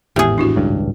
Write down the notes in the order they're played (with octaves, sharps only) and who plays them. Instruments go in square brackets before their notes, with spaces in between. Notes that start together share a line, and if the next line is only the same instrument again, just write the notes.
[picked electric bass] G#1 E2 [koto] A2 G#4 [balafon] G4
[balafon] D4 E4 F#4
[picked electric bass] G#1 C#2 G2